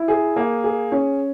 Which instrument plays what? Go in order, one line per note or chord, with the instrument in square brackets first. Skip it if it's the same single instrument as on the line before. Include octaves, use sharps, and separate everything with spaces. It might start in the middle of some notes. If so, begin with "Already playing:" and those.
Already playing: [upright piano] E4
G#4
A#3
G#4
C#4